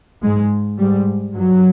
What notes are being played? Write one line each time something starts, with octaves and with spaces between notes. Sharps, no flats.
G#2 G#3
G#2 G3
G2 F#3